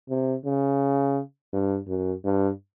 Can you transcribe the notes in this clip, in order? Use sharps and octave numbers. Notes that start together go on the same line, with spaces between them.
C3
C#3
G2
F#2
G2